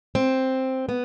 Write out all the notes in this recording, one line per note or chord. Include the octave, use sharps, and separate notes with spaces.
C4
B3